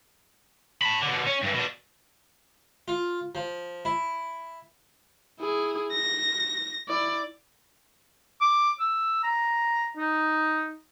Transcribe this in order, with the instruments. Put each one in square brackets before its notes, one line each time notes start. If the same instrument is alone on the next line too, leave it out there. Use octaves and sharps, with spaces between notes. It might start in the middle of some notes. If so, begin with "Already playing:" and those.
[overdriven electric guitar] A5 B5
B2 D3
C#4
G2 E3
B2 D4
[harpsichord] F4
F3
E4
[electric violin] E4 G#4
A#6
E4 D5
[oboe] D6
E6
A#5
D#4